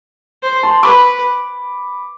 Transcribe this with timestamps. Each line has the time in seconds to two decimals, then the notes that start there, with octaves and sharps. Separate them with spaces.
0.42 C5
0.63 A5 C6
0.83 B4 B5 D6